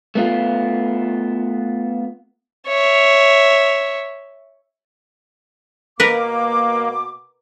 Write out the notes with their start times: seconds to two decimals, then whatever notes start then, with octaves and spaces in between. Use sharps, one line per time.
0.15 A3 B3 F4
2.67 C#5 E5
6.00 B2 A#3 A#4 B4 D6